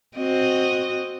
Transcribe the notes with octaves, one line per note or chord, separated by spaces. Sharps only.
C4 F#4 D#5